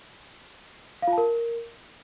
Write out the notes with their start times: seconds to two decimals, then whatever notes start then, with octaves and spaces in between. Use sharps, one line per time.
1.02 F5
1.07 F4
1.13 A5
1.18 A#4